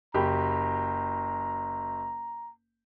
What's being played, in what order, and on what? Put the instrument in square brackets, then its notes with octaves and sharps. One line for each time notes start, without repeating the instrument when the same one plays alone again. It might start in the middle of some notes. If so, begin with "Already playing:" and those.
[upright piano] F#1 G4 B5 [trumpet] A#5